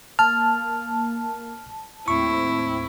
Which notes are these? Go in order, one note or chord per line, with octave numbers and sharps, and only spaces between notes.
A#3 A5 F6
D#2 A2 C4 E4 C#6